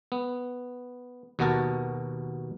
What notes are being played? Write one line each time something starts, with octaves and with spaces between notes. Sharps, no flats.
B3
D#2 B2 B3 F#4 A#4 A5